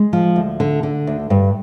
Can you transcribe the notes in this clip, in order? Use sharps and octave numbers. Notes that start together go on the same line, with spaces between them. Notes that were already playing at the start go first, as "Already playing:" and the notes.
Already playing: G#3
F3
D2
D3
D3
D2
G2